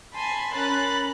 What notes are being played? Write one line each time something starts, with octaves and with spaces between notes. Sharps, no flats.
G#5 A5 B5 C6
C#4 A#4 B5 F#6 A6